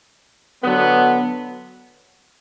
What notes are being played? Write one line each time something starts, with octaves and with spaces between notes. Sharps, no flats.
D3 F#3 B3